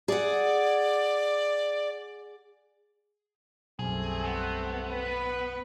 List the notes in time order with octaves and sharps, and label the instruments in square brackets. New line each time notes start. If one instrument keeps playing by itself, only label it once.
[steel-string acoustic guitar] G#4 F#5 [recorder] D5
[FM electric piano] B1 F#2 [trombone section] G3 A3 C4 [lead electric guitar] G#4
[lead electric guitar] B3
[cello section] B4